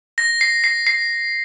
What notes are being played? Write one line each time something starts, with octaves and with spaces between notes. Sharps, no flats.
A#6
C7
C7
C7